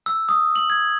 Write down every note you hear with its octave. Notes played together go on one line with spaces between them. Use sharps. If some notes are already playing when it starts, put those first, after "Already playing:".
E6
D#6
F#7
G#6